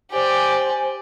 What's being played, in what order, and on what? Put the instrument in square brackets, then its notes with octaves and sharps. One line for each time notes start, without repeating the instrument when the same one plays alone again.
[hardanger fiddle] G4 D5 [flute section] C5 G#5